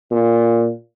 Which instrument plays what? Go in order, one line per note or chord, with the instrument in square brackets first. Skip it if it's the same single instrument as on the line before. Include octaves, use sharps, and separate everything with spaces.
[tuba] A#2